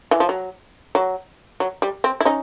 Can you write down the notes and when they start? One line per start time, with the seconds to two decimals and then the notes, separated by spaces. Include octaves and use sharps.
0.11 E3
0.20 F3
0.29 F#3
0.95 F#3
1.60 F#3
1.82 G3
2.04 C4
2.21 E4
2.25 C#4 D#4